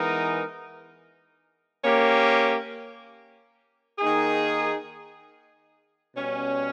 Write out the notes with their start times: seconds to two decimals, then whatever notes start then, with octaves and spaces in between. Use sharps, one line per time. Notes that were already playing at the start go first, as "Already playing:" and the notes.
Already playing: E3 G#3 B3 D#4 A#4
1.83 A#3 C#4 G4
3.99 D#3 A#3 D#4 G#4
6.14 B2 G3 C#4